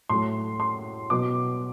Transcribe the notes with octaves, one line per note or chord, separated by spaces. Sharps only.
A2 F#3 A3 C6
C6
B2 F#3 B3 D6